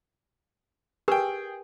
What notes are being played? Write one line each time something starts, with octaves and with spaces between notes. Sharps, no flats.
G4 G#4 A#4 B4 G5